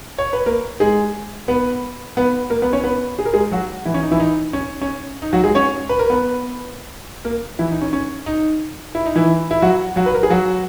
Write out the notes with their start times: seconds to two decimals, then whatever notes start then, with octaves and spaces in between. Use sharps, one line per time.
0.18 C#5
0.33 B4
0.46 A#3 A#4
0.80 G#3 G#4
1.48 B3 B4
2.17 B3 B4
2.50 A#3 A#4
2.62 B3 B4
2.73 C#4 C#5
2.84 B3 B4
3.19 G#4
3.25 A#4
3.34 G#3 G#4
3.52 F#3 F#4
3.85 E3 E4
3.94 C#4
4.02 D#4
4.11 E3 E4
4.20 D#4
4.53 C#4
4.81 C#4
5.22 D#4
5.33 F#3 F#4
5.44 G#3 G#4
5.55 C#4 C#5
5.89 B4
5.99 A#4
6.10 B3 B4
7.25 A#3 A#4
7.59 E3 E4
7.71 D#4
7.82 C#4
7.93 C#4
8.26 D#4
8.95 E4
9.06 D#4
9.16 E3 E4
9.51 E4
9.62 F#3 F#4
9.96 F#3 F#4
10.06 B4
10.15 A#4
10.23 G#4
10.30 F#3 F#4